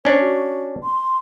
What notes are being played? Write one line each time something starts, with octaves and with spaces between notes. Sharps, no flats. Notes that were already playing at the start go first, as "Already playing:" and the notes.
C#4 D4 C5
F#4
C6